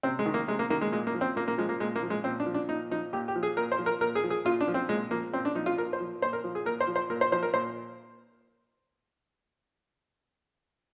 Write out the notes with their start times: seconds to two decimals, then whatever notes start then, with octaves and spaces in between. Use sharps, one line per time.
0.03 C3 C4
0.19 G#3
0.26 D#3
0.34 A#3
0.48 C3 G#3
0.59 A#3
0.70 D#3 A#3
0.81 G#3
0.92 A#2 G#3
1.07 A#3
1.14 F3
1.21 C4
1.36 A#2 A#3
1.48 A#3
1.58 F3 G#3
1.69 A#3
1.80 A#2 G#3
1.96 A#3
2.03 F3
2.10 G#3
2.24 A#2 C4
2.40 D4
2.46 F3
2.54 D4
2.69 A#2 D#4
2.91 F3 D#4
3.13 A#2 G4
3.28 G4
3.36 F3
3.43 G#4
3.57 A#2 A#4
3.72 C5
3.79 F3
3.86 A#4
4.01 A#2 A#4
4.15 G#4
4.24 F3
4.30 G#4
4.45 A#2 F4
4.61 D4
4.68 F3
4.74 C4
4.89 A#2 G#3
5.11 F3 A#3
5.33 A#2 C4
5.45 D4
5.55 F3 D#4
5.66 F4
5.77 A#2 A#4
5.93 C5
6.00 F3
6.22 A#2 C5
6.33 A#4
6.44 F3
6.55 G#4
6.65 A#2 A#4
6.81 C5
6.87 F3
6.96 C5
7.10 A#2 A#4
7.21 C5
7.32 F3 C5
7.43 A#4
7.54 A#2 C5